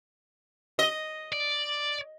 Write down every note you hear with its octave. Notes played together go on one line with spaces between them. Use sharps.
D#5
D5